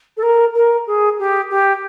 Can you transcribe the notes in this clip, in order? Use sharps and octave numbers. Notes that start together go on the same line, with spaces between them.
A4
A#4
A#4
G#4
G4
G4